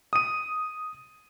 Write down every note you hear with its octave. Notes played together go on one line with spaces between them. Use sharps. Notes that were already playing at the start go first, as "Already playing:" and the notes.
D#6 D#7